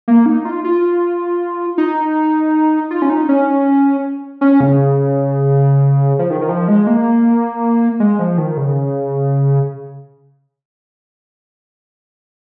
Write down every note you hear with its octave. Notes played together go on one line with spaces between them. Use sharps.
A#3
D#4
F4
F4
D#4
F4
C#4
D#4
C#4
C#4
C#3
F3
D#3
D#3
F3
G#3
A#3
G#3
F3
D#3
C#3